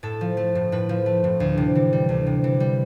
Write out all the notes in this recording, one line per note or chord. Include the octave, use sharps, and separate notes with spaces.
A2 A4
F3
A3
A2
A2 B4
F3
A3
A2
D2
C3
E3
G3
D2
C3
E3
G3